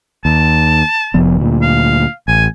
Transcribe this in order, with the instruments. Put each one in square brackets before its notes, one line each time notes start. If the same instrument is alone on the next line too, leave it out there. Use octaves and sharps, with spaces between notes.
[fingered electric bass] D#2 [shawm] A5
[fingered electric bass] F1 F3 B3
D2 A#2
[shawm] F5
[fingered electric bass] A1 [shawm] G#5